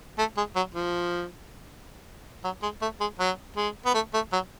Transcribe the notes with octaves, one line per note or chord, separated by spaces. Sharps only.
A3
G#3
F#3
F3
F#3
G#3
A3
G#3
F#3
G#3
B3
A3
A3
F#3